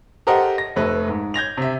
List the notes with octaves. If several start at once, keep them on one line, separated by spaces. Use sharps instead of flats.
G4 A4 A#4 C5 D#5 F#5
A#6
F1 A3 B4
G#2
G6 G#6 A#6 F7
C3 E5